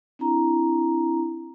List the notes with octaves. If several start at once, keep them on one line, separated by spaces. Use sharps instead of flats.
C4 D4 E4 A#5